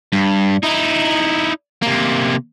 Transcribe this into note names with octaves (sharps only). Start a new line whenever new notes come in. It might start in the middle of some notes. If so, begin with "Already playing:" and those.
G2
D#4 E4
C3 A#3